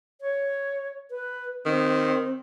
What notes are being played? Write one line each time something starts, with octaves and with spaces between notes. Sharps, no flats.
C#5
B4
D#3 C4